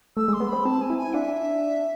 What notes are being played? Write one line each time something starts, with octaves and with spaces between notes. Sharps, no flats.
A3 E6
G#3
C6
B3
C4 B5
C4 A5
G#5
E4
G#5
D4 E5